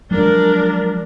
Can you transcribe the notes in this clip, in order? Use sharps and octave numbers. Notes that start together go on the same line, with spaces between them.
F3 F#3 G#3 D4 A#4